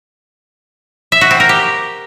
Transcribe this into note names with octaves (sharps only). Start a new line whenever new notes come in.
E5
F#4
C4
A#4
G4